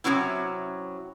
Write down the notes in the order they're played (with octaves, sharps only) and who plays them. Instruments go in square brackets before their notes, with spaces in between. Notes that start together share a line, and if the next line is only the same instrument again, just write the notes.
[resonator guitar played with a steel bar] C3 E3 F#3 C#4 E4